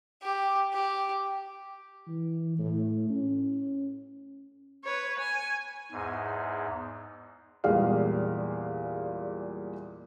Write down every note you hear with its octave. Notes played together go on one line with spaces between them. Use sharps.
G4
G4
E3
A2
C#4
B4 C#5
G#5
E2 G#2
E2 A#2 G3 G#3 F5